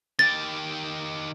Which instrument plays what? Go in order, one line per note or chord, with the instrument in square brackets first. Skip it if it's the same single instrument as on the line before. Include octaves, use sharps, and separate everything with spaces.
[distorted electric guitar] D#3 G4 [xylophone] A6